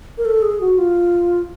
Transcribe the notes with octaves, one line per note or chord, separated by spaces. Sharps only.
A#4
A4
G#4
F#4
F4